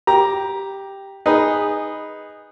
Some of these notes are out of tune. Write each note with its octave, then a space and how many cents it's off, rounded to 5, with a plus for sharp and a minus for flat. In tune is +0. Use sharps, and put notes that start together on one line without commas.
G4 +0 A#5 +10
D#4 +0 G#4 -15 B4 +0